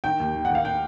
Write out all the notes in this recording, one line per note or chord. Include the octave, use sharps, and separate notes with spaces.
D#3 G5
D#2
D#3
D#2 F#5
F5
G5